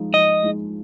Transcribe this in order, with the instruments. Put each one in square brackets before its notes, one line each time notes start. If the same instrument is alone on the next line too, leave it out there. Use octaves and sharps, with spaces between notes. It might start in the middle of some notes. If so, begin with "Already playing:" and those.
Already playing: [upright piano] F3 G#3 D#4
[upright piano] F3 [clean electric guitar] D#5
[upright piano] G#3 D#4